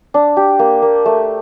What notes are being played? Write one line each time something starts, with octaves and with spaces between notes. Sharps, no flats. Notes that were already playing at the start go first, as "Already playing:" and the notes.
D4
G4
A#3
A#3
A3